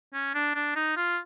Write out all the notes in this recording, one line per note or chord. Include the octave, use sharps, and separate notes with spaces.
C#4
D4
D4
D#4
F4